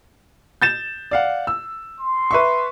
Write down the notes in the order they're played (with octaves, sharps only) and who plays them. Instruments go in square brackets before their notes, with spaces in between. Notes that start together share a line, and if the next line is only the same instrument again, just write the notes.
[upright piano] G6 A6 E7
D5 F5 F#5
E6
[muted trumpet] C6
[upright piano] B4 E5 C#6